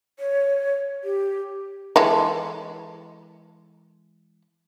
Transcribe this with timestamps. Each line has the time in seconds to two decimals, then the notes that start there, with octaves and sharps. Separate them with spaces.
0.19 C#5
1.04 G4
1.96 E3 G#3 A4